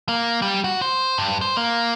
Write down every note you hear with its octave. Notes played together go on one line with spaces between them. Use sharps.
A#3
G3
F#4
C5
G2
C5
A#3